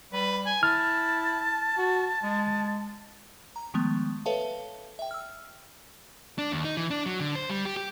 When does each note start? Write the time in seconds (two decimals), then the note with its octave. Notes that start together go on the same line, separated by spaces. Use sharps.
0.13 G3 B4
0.46 G#5
0.63 E4 A5 F6
1.78 F#4
2.23 G#3
3.56 A#5
3.74 D#3 F3 G#3 A3 B3
4.26 A4 B4 C#5 E5 F5 A5
4.99 E5 G5
5.11 E6 F6
6.38 D4
6.52 D#2
6.65 D#4
6.77 E3
6.90 D4
7.06 F#3
7.20 D3
7.36 C5
7.50 G3
7.65 G4
7.77 G4